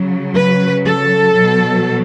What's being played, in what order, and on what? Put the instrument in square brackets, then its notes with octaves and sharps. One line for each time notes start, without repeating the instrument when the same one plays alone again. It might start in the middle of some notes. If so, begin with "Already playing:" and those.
Already playing: [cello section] C#3 F#3
B4
A4
B2 F#3